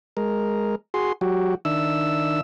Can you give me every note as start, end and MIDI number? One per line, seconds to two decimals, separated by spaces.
0.17 0.75 56
0.17 0.75 70
0.94 1.12 66
0.94 1.12 68
0.94 1.12 84
1.21 1.55 54
1.21 1.55 66
1.21 1.55 67
1.65 2.41 51
1.65 2.41 62
1.65 2.41 76
1.65 2.41 88